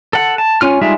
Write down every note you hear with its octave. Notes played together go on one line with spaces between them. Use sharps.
A4 F#5
A5
C#4 F4 F6
G3 G#3 D#4 F4 E5